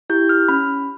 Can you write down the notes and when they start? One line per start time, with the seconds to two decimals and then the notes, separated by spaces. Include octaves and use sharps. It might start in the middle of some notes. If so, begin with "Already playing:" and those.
0.10 E4 G4 G6
0.29 F6
0.48 C#4 B5